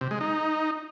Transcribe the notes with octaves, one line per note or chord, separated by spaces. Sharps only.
C3
G#3
D#4